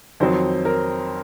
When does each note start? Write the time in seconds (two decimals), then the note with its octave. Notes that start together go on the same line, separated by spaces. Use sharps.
0.20 F2 D#3 F#3 C4 C5
0.65 A#4